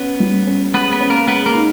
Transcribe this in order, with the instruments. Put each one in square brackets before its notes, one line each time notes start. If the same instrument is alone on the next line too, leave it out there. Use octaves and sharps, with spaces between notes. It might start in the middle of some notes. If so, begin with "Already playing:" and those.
Already playing: [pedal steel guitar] B3 B4 [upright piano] C#4
[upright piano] G3
C#4
[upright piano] G#3 [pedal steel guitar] B3 B4
[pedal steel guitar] B3 B4
[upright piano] C#4
[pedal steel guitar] A#3 A#4
[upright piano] G#3 [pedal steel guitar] B3 B4
[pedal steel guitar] A#3 A#4
[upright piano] D#4